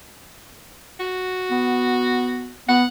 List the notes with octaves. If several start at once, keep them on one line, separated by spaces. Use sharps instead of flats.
F#4
B3
B3 F#5